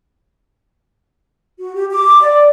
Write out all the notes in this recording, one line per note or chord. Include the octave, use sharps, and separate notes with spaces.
F#4
G4
D6
D5